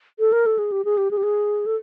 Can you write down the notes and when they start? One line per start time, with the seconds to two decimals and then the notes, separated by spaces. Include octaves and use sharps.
0.19 A4
0.32 A#4
0.46 A4
0.58 G#4
0.72 G4
0.85 G#4
0.97 G4
1.11 G#4
1.17 G4
1.23 G#4
1.66 A4